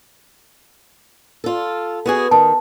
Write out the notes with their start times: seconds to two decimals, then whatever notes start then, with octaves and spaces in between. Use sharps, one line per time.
1.44 F4 A4
2.06 B3 F#4 G#4
2.31 D#3 A5